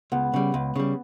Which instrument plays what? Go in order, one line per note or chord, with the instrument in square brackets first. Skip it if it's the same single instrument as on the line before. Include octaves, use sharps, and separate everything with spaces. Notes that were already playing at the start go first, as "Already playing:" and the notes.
[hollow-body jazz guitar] C#2 [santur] B3
[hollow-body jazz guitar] C#3 G3
C#2
C#3 G3